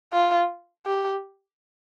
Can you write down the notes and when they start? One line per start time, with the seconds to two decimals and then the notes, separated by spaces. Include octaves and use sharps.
0.13 F4
0.86 G4